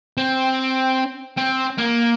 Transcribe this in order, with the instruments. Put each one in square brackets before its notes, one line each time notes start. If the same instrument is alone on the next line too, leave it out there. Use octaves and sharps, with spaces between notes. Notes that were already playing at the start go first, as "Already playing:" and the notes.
[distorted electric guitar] C4
C4
A#3